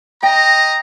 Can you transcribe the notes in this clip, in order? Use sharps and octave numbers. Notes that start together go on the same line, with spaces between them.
D#5 G5 A#5